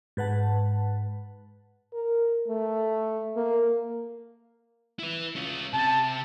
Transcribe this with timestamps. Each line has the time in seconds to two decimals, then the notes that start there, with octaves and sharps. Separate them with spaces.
0.17 G#2 B4 F#5 A5
1.94 A#4
2.48 A3
3.37 A#3
4.99 E4 B4
5.36 C#4 F4
5.73 C3 C4 A5